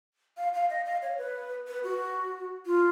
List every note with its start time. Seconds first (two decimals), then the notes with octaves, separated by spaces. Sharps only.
0.37 F5
0.54 F5
0.70 D#5
0.85 F5
1.02 C#5
1.18 B4
1.67 B4
1.84 F#4
2.66 F4